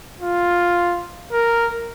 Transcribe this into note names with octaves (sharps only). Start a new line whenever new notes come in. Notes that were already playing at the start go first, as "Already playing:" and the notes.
F4
A#4